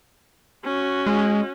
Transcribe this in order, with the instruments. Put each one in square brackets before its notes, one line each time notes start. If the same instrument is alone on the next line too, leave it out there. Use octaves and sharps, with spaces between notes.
[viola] C#4 F#4
[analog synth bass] G#3